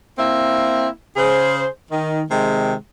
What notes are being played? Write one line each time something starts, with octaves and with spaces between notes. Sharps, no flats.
A#3 C4 E4 E5
C#3 G#4 C5
D#3
C3 D#3 G#3